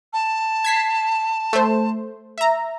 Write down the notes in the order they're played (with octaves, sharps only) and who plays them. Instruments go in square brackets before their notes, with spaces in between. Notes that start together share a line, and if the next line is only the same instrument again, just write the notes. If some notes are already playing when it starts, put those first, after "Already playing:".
[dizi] A5
[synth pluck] G#6 B6 C7
A3 C5
E5 A#5